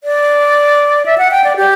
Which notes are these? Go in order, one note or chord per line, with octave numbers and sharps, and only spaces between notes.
D5
E5
F#5
G5
D5
G4